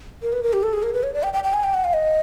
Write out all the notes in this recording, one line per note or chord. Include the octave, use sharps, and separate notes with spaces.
A#4
B4
A#4
G4
A4
G#4
A#4
B4
C#5
D5
G5
G5
G5
G#5
G5
F#5
F5
D#5